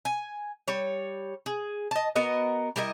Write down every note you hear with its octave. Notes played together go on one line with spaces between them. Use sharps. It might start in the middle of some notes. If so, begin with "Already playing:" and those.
G#5
G3 C#5
G#4
D#5 A5
B3 F#4 A#4 D#5
G3 E4 A#4 D#5